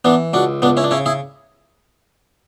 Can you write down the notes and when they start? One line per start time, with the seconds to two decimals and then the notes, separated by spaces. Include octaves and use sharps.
0.05 E3 B3 D4
0.33 C#2 D4 F#4
0.62 C#2 B3 D4
0.77 C#4 E4
0.84 D4
0.91 C#3 C#4 E4
1.06 E4 G#4